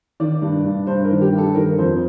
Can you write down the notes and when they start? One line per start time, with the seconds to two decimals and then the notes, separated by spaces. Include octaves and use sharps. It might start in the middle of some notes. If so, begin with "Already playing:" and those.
0.20 D#3 D5
0.42 G2
0.65 G2
0.87 G2 C5
1.04 A#4
1.11 D#3
1.22 G4
1.32 G2
1.38 A4
1.55 D#3 A#4
1.78 F2 C5